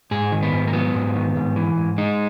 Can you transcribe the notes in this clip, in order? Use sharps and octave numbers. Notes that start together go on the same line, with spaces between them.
G#2 G#4
D#3
B3
G#2
A#3
F#3 B3
G#2
D#3
G#2
E3
G#2
G#3 D#4